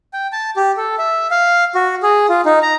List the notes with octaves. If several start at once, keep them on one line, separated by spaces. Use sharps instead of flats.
G5
A5
G4
A4
E5
F5
F#4
G#4
F4
D#4
A#5